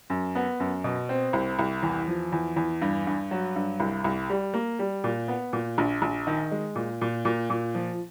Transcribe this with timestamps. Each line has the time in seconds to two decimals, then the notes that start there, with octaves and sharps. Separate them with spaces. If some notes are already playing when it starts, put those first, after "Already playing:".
0.10 F#2
0.35 B3
0.60 F#2
0.84 B2
1.09 C4
1.33 C2
1.59 C2
1.83 E2
2.08 F3
2.32 E2
2.56 E2
2.82 G2
3.07 G2
3.31 F#3
3.56 G2
3.80 C2
4.04 C2
4.30 G3
4.54 A#3
4.79 G3
5.04 A#2
5.28 B3
5.53 A#2
5.78 A#1
6.02 A#1
6.27 D#3
6.51 G#3
6.76 A#2
7.01 A#2
7.25 A#2
7.50 A#2
7.75 F3